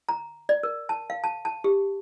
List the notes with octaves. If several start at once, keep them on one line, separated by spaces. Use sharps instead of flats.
A#5
D5
A#4
A5
F5
A5
A5
G4